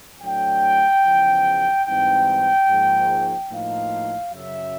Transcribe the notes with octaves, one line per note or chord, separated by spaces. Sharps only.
A2 F#3 A3 D4 G5
E2 C#3 F3
G#2 E3 G3 C4 D#4 G5
G#2 F3 A#3
A2 F3 A#3 D#4 F5
F#2 C#3 F#3 E5